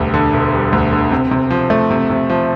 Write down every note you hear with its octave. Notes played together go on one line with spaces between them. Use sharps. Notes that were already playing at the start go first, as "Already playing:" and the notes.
Already playing: E1 D2 G3
D3
E1
G3
D2
D3
C3
C3
F3
A3
C3
C3
F3